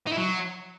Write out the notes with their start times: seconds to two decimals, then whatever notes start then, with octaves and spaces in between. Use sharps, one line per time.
0.07 D#4
0.12 E4
0.17 F#3